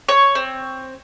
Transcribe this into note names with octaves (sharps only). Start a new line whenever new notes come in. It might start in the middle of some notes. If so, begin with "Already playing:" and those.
C#5
C4